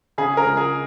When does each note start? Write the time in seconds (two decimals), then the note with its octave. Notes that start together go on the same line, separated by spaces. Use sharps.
0.18 C#3 G#4
0.37 A#4
0.44 C#2
0.57 G#4